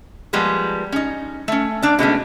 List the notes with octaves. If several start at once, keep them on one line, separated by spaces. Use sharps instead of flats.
F3 G3 G#3 A#3 B3
C#4 D#4
A3 C#4
A#3 D4 D5
B2 G#3 A3 C#4